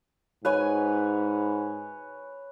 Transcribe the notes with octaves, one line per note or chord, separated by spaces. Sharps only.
G#2 B4 C#5 G#5